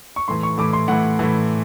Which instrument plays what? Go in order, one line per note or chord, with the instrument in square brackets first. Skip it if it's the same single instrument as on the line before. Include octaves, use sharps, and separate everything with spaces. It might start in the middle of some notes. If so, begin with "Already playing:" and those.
[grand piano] C#6
A2 E3 C6
C#6
A2 E3 D6
C6
A2 E3 F#5
A2 E3